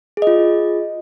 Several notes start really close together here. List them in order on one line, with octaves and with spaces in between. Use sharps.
G#4 D#5 F4